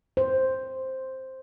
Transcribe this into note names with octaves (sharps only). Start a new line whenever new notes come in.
C5